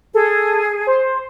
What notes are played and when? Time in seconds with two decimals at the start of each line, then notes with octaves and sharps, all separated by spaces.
0.14 G#4 A4
0.87 C5